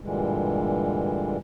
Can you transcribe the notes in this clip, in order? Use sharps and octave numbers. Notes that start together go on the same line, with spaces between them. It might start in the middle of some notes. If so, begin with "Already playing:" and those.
G2 A#2 D3 E3 G3 G#3